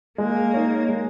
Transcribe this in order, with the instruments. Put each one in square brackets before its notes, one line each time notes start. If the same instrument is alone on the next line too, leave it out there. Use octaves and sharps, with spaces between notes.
[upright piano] G#3 [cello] A#3
[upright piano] D#4 A#4 C#5
G#3